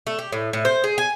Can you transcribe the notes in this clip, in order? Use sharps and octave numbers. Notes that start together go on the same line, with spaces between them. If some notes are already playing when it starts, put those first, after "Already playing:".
A3
G4
A2
A2
C5
G#4
G#5